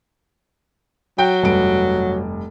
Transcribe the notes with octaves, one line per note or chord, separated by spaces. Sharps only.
F#3 G5
F1 G2 D7